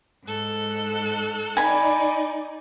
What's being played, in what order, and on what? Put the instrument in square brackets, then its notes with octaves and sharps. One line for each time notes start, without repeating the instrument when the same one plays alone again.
[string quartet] G#2 A4 F#6
[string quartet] D#4 D5 [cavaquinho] G#5 B5